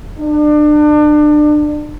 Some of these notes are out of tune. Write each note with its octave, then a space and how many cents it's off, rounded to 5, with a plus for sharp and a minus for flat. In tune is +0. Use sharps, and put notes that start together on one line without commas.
D4 +30